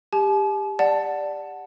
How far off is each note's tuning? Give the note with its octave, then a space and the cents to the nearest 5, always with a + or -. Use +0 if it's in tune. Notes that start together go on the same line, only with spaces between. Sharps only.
G4 +25 A5 -45
D5 +0 F#5 +0 A5 +0